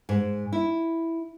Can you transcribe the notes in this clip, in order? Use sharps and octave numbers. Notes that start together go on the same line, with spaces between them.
G#2
E4